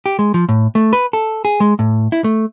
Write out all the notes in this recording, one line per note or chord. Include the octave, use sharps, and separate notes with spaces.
G4
G#3
F3
A2
A3
B4
A4
G#4
G#3
A2
E4
A3